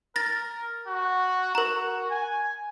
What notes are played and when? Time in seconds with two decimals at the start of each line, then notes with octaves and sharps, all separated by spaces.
0.16 A#4 A6 A#6
0.87 F#4
1.55 F#4 A#4 A#5
2.10 G#5